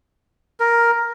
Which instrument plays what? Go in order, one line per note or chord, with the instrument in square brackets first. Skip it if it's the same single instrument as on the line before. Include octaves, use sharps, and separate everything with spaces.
[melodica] A#4